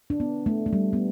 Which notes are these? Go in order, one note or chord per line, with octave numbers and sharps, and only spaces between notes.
D4
B3
A3
A3
G3
B3